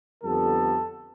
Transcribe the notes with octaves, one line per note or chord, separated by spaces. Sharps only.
F2 D3 G3 B3 A4